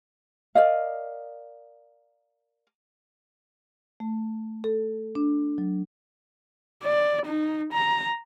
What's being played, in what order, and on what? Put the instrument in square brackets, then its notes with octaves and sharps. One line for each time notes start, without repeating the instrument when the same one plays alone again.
[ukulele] A#4 D5 D#5 F5
[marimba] A3
A4
D4
F#3
[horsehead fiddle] D5
D#4
A#5